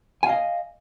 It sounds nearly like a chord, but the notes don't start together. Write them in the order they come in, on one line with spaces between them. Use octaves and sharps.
G#5 F5 D#5